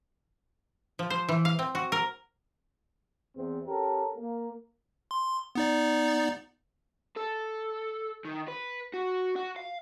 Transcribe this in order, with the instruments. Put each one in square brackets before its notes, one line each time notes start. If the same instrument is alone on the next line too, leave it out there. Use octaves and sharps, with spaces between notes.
[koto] F3
C5
E3
F5
C4
F#4
A#4
[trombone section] E2 C4
C#4 G4 A4 A#4
A#3
[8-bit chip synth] C6
B3 D#4 D5
[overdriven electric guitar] A4
D#3
B4
F#4
F#4
F5